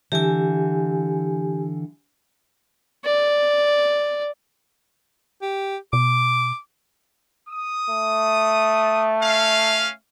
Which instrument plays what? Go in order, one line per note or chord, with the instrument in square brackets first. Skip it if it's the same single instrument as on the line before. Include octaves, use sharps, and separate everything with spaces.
[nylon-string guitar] D3 E3 [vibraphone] G4 G#5
[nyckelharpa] D5
[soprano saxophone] G4
[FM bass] B2 [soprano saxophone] D6
[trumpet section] D#6
[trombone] A3
[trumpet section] C#4 F5